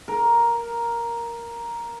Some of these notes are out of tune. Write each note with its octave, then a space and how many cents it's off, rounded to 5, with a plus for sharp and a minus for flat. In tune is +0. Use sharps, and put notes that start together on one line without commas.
A#4 +5